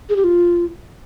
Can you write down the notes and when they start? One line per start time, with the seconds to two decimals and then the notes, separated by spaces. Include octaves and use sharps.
0.09 G#4
0.16 G4
0.24 F4